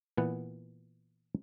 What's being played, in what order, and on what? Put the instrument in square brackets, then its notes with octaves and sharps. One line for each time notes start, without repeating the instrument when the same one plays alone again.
[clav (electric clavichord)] A#2 E3 B3 F#5